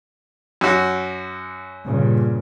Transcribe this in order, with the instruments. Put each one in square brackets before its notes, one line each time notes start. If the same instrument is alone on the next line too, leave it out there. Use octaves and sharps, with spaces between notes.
[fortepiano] F#2 F#4
[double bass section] G2 A#2 C#3